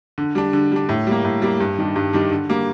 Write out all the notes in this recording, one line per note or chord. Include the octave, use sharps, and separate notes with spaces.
D3
G3 D4
D3
G3 D4
A2
G3 A#3
A2
G3 A#3
G2
D#3 G3 D4
G2
D#3 G3 D4
D3
G3 A#3